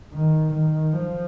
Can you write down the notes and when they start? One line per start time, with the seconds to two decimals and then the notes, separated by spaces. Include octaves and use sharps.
0.13 D#3
0.53 D#3
0.93 F3